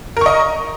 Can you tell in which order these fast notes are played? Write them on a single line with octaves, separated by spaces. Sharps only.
A#4 C#6 D#5